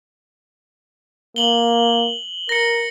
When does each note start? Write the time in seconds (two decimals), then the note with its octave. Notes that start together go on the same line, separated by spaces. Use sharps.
1.36 A#3 F#7 G7
2.49 A#4 A#6 C#7